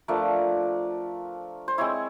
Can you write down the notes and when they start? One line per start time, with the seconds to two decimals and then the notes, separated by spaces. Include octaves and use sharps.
0.08 F3 A3 D4 A#4
1.68 C5
1.78 G#3 C4 E4 C#5